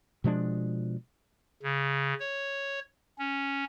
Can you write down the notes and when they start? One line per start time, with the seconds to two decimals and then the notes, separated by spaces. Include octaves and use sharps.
0.24 B2 F3 G#3 D4
1.63 C#3
2.20 C#5
3.19 C#4